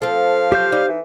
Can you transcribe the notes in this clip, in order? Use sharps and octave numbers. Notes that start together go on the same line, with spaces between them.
F3 C4 A4 F5
F#3 G4 C5 G6
G3 D#4
E3